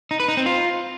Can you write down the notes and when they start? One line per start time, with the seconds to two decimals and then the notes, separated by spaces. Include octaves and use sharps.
0.11 D#4
0.20 B4
0.28 D#4
0.37 C4
0.46 F4